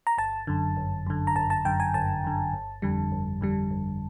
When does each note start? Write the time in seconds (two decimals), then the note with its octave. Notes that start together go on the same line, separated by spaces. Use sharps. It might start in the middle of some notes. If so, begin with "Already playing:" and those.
0.07 A#5
0.18 G1 A5
0.47 F#2 D3
0.77 G1
1.07 F#2 D3
1.27 A#5
1.36 G1 A5
1.50 A5
1.65 F#2 D3 G5
1.80 G#5
1.94 G1 A5
2.24 F#2 D3
2.53 G1
2.82 F2 D3 G3
3.12 G1
3.41 F2 D3 G3
3.71 G1